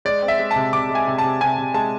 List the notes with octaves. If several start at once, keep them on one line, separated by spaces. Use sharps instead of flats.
G#3 D5
C4
E5
G#3
C3 A5
C3 D6
G#3
G#5
C3
C3 A5
C3 G#5
C3
G#3 A5